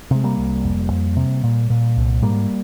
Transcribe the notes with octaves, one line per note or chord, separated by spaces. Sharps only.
C3 G#3
G3 A#3
C2
F1
F2
C3
A#2
A#2
C2
G#2 G3 A#3